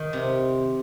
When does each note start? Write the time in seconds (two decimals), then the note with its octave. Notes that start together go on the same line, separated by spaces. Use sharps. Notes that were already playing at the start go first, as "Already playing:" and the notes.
Already playing: D#3
0.13 C3